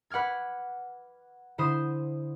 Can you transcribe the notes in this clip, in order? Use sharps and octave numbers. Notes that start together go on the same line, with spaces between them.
B4 F#5 D6 F6 G#6
D3 E4 C5 D#6 E7